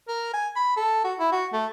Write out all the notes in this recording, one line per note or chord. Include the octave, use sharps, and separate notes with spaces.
A#4
G#5
B5
A4
F#4
E4
F#4
A3